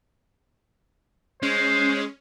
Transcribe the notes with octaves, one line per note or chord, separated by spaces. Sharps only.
G#3 C#4 C5